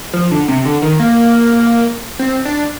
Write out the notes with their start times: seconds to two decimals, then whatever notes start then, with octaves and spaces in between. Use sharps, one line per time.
0.13 F3
0.31 D3
0.48 C3
0.65 D3
0.82 D#3
0.99 A#3
2.19 C4
2.45 D4